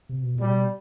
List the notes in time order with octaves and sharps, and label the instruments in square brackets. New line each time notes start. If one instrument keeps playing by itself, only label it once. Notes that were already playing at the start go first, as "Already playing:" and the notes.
[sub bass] C3
B2
A#2
[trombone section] G3
[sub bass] B2